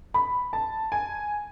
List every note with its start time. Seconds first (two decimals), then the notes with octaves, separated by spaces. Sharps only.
0.14 B5
0.53 A5
0.92 G#5